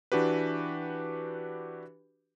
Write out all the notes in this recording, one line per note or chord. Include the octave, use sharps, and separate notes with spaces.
E3 D4 F#4 G4 B4